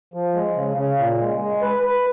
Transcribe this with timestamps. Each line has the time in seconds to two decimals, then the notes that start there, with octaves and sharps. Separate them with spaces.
0.14 F3
0.35 G#3
0.55 C#3
0.77 C#3
0.98 A#2
1.20 G#3
1.40 G#3
1.62 B4
1.83 B4